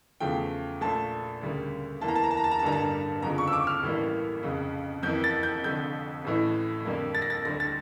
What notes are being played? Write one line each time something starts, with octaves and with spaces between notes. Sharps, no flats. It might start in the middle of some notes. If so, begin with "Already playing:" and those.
E2 C#3 F3 A3 G5
A#1 A#2 A3 A5
D2 C#3 G3 A#3
E2 E3 A#3 A5
A#5
A5
A#5
A5
A#5
A5
A#5
A5
A1 G2 D3 G3 A#3 A#5
A5
G1 F2 C#3 F3 A#5
C#6
E6
D6
F6
A1 A2 E3 G3 A#3
F1 F2 C#3
F2 E3 A#3 G6
A6
G6
F1 F2 D3 G6
A1 A2 E3
F2 D3 G3 A#3
A6
A#6
A6
D2 D3 G3 A#6
A6